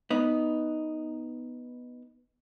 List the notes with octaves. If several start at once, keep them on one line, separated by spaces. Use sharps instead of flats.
B3 D#4